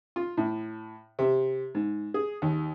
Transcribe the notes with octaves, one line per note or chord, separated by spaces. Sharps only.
F4
A2
C3
G#2
G#4
D#2